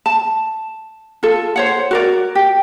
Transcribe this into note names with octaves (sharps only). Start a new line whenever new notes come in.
A5
F4 A4
C5 C#5 F#5
F#4 A#4 D5
G4